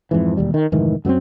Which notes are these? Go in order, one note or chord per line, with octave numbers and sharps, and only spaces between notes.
F2 G#2 E3
E1 D#2 G3
D#3
F1 G#2 D#3 E3
F#2 F#3 B3 C4